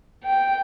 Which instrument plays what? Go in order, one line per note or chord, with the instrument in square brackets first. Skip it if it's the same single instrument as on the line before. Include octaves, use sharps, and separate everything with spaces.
[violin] G5